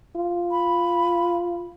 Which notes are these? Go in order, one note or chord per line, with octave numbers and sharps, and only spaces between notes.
F4
B5